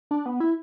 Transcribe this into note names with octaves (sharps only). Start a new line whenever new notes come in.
D4
B3
E4